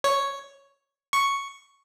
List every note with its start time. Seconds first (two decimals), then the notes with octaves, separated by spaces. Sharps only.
0.04 C#5
1.13 C#6